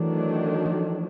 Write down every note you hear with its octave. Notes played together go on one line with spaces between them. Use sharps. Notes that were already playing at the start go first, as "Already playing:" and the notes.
Already playing: D#3 E3 F#3 A3 D4
F3